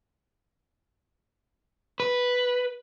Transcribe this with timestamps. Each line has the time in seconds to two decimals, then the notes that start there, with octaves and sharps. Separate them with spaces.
2.00 B4